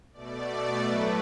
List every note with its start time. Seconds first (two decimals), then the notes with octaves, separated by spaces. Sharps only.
0.13 B2 A3 D5
0.82 A2 F#3 A3 B4